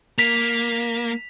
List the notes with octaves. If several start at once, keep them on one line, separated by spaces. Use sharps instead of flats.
A#3 B6 F7